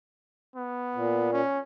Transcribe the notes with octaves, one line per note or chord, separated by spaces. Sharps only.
B3
A#2
C#4